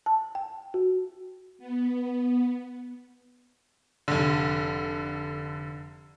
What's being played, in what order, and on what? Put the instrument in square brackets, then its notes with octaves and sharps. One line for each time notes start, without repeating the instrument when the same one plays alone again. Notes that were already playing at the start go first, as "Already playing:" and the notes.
[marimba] A5
G5
F#4
[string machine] B3
[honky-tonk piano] F1 D3